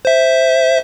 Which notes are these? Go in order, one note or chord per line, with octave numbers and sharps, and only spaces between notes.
C5 E5